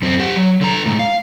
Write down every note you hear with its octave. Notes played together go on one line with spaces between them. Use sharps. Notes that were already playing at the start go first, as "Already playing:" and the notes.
F#2 C4
G4 F#5
F#3
D3 A#5
A2 G#3
F5